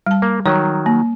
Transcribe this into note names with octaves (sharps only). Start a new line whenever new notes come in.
G3 A5
A#3
D#3 F#3 C#5
A#3